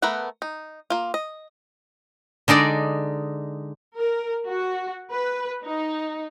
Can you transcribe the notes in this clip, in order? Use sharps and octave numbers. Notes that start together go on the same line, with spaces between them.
A3 B3 A#4 B4 F#5
D#4
A#3 F4
D#5
D3 G#3 D#4 D5
A#4
F#4
B4
D#4